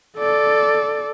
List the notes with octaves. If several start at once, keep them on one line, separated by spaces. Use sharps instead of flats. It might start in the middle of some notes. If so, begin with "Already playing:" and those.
A4 D5